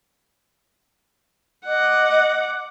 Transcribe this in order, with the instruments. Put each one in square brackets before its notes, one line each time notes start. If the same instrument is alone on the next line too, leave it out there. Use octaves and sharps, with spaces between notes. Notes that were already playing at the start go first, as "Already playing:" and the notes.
[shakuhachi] D#5 [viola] F#5 D6